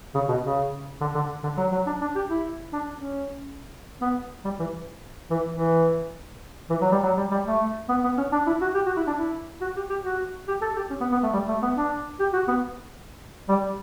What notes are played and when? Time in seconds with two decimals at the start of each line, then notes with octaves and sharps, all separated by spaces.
0.14 C#3
0.28 B2
0.43 C#3
1.01 D3
1.14 D3
1.43 D3
1.57 F#3
1.72 F#3
1.86 D4
2.01 D4
2.15 G4
2.29 E4
2.72 D4
2.94 C#4
4.01 B3
4.44 G3
4.59 E3
5.30 E3
5.52 E3
6.70 E3
6.81 F#3
6.92 G3
7.03 F#3
7.17 G3
7.31 G3
7.46 A3
7.88 B3
8.03 B3
8.17 C#4
8.32 D4
8.46 E4
8.61 F#4
8.74 G4
8.86 F#4
8.96 E4
9.07 D4
9.17 E4
9.61 F#4
9.76 G4
9.89 G4
10.04 F#4
10.47 G4
10.61 A4
10.76 G4
10.90 C#4
11.00 B3
11.11 B3
11.23 A3
11.33 G3
11.48 A3
11.62 B3
11.76 D4
12.19 G4
12.33 F#4
12.48 B3
13.48 G3